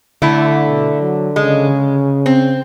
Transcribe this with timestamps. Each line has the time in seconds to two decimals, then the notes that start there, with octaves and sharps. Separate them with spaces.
0.22 D3 A3 E4
0.67 B2
1.01 F#3
1.36 C#3 G#3
2.26 C4